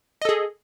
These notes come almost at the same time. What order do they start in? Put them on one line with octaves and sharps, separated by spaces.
D#5 A4 G#4